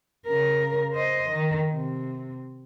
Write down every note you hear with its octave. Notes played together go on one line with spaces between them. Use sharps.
C#3 A#4
C5 D#5
D#3
C3